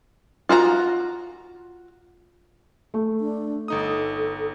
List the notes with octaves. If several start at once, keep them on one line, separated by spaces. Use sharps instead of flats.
F4 F#4 G#4 A#5
A3
D4
G1 D#4 A4 D#6